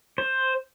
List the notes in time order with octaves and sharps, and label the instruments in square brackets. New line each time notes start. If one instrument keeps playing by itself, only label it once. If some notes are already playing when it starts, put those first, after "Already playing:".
[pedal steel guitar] C5